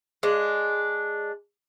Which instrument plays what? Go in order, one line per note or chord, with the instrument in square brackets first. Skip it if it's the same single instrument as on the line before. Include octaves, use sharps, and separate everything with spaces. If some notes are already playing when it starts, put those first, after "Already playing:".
[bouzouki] G#3 D4